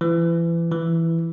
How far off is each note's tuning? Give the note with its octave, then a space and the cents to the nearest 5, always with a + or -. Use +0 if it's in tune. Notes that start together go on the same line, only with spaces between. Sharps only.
E3 +30
E3 +5